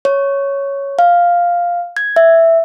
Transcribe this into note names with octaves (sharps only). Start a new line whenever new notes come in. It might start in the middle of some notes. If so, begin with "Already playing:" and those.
C#5
F5
G#6
E5